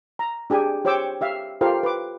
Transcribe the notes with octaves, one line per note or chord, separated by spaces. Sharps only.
A#5
D4 G4 G#4 G#5
G4 C5 C#5 G5 D6 E6
G4 E5 F5
F4 G4 A4 A#4 C5 F5
B4 D6